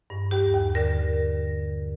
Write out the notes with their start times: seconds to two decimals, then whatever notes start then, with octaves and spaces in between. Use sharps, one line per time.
0.10 G2
0.31 D#2 G4
0.54 D#2
0.75 D3 A#4